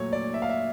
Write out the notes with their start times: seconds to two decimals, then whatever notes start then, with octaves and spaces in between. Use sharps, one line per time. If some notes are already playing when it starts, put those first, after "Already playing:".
Already playing: A#2 F#3 A3 C#5
0.13 D5
0.34 E5
0.42 F5
0.50 E5